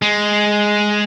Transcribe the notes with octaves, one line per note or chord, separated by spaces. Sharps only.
G#3